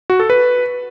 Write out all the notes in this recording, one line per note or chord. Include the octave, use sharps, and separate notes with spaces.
F#4
A4
B4